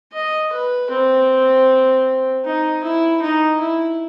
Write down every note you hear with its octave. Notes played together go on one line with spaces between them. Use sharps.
D#5
B4
C4
D#4
E4
D#4
E4